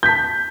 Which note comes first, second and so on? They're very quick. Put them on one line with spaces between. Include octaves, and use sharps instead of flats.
G6 B6 A5